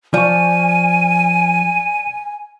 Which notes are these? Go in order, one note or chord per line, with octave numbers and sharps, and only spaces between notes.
F3 D5 G#5 C#6 D#7